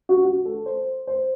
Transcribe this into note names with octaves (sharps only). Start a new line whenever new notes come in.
F#4
F#4
A4
C5
C5